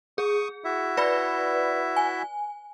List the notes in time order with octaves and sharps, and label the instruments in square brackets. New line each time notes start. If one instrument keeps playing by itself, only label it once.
[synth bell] G#4 [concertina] C#6 D#6
[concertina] E4 F#4 E5
[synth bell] B4 D5 B5
G#5